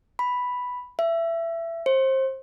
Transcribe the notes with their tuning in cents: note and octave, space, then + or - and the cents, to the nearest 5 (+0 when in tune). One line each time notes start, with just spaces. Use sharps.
B5 +0
E5 +20
C5 +25